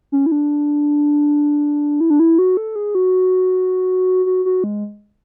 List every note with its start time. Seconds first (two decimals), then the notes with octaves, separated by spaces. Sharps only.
0.12 C#4
0.26 E4
0.32 D4
2.00 E4
2.10 D4
2.20 E4
2.38 F#4
2.57 A4
2.76 G#4
2.95 F#4
4.26 F#4
4.45 F#4
4.64 G#3